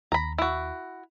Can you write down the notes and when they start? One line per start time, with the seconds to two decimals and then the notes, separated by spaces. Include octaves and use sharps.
0.12 D#2 A#5 B5
0.38 E4 F#4